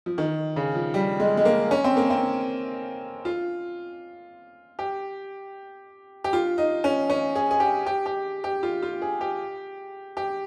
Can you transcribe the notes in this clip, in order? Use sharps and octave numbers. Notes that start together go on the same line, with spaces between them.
F3
D#3
C#3
F3
G3
G#3
G#3
A#3
C#4
C4
A#3
C4
F4
G4
G4
F4
D#4
C#4
C#4
G#4
G#4
G4
G4
G4
G4
F4
F4
G#4
G4
G4